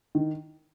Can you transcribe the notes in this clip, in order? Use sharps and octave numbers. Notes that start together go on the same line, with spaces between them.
D#3